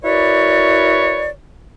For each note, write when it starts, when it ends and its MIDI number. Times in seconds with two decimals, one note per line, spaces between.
0.02 1.30 64
0.02 1.30 66
0.02 1.30 70
0.02 1.30 71
0.02 1.30 73
0.02 1.30 74